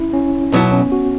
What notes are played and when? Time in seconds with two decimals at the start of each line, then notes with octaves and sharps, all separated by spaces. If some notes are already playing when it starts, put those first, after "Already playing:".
Already playing: C#4 E4
0.14 C#4
0.52 B1 B2 F#3 B3 E4
0.72 C#4
0.92 F#4